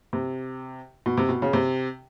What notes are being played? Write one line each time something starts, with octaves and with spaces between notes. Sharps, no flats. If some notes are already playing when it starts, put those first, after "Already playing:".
C3
B2
C3
B2
C#3
C3